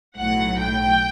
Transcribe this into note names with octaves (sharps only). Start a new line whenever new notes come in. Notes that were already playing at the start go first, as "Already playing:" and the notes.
B1 A2 F#3 F#5
G5